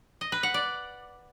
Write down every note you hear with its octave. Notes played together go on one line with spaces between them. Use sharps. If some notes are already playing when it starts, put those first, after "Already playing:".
D#5
B4
F#5
D5